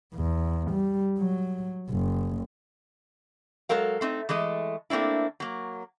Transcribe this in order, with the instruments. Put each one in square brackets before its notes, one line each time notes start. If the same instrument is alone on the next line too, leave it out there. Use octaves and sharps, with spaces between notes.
[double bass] E2
G3
F#3
F#1
[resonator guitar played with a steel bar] F#3 G#3 A4 A#4 F5
A3 C4 D#4
E3 G#3 A3 D#5
A3 A#3 C4 D4 E4
F#3 A#3